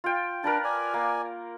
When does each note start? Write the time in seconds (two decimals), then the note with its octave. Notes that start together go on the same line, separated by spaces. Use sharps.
0.04 F4 G5
0.44 D4 A#4 B4 A5
0.64 D5 G#5
0.94 A#3